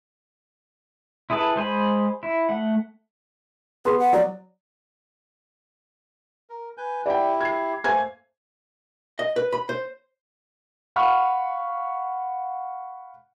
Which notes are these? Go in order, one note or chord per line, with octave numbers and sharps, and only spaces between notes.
E4 G#4 A4 B4 A5
G#3 C5 G#5 B5
E4
A3 F#5
B3 G#4 C6
F#5
F#3 D5
A#4
B4 G#5 G6
E4 G4 D5 G5
G#6 C7
A3 A#3 C5 G#5 G#6
D#5
B4
B5
C5
F5 F#5 B5 C#6 F6